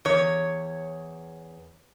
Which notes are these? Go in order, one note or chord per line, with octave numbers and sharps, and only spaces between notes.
E2 C#5